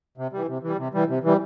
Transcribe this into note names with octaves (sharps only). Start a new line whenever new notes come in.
C3
E3 G3
C3
E3 G3
C3
E3 G3
C3
E3 G3